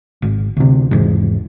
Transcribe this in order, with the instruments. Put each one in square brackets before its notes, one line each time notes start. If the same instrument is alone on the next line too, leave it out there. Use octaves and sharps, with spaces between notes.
[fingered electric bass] G#1
D2 C3
G#1 E2 G#2